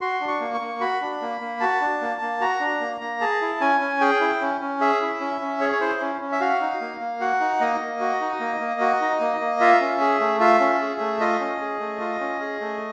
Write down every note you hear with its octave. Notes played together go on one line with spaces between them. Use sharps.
F#4 C6
D4
C#6
A#3
C#6
A#3
F#4 B5
D4
A#3
A#3
F#4 A5
D4
A#3
A#3
F#4 A#5
D4
A#3
A#3
G#4 A5
E4
C#4 G#5
C#4
G#4 G5
E4
C#4
C#4
G#4 E5
E4
C#4
C#4
G#4 C#5
C#5
E4 C5
C#4
C#4
E5
F#4 F5
D#4
A#3
A#3
F#4 F#5
D#4
A#3 D#5
A#3
F#4
D#4
A#3
A#3
F#4
D#4
A#3
A#3
F4 E5
C#4
G#4
A3
F4 E5
C#4
G#4
A3
F4 D#5
C#4
G#4
A3
F4
C#4
G#4
A3